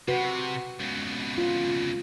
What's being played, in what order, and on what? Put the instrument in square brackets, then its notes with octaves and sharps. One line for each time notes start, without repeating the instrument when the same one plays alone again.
[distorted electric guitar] C3 [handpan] F#4 B4
[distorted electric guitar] C#2 B2
[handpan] F4